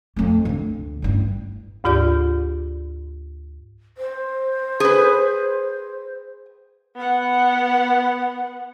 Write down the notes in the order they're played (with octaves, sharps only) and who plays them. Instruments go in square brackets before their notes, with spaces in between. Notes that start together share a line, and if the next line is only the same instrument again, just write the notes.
[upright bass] F2 A3
D2 D3
A1 G2
[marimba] D2 G#2 F4 G4 D5
[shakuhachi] C5
[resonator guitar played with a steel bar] G#4 B4
[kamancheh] B3 F#5